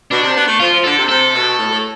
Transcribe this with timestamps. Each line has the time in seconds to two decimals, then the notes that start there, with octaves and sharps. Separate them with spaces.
0.10 B2 D4
0.23 C3
0.35 B3
0.47 A3
0.60 F3 F4
0.72 F3
0.84 D3 A4
0.97 C3
1.09 C3 A4
1.34 B2
1.58 A2
1.70 A2